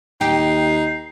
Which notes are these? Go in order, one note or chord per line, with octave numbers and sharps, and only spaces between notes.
D#2 D#4 G4 C7